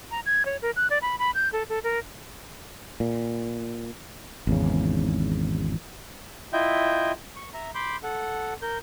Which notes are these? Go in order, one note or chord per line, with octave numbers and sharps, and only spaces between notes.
A#5
G#6
C#5
A#4
F#6
D5
B5
B5
G6
A4
A4
A#4
A#2
G#1 E2 C#3
E4 F4 D#5 E5 G5 G6
C#6
E5 A#5
B5 C6 D6 G6
A4 F#5
A#4 G6